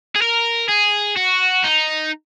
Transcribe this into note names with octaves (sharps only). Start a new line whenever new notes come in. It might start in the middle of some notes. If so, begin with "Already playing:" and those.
G#4
A#4
G#4
F#4
D#4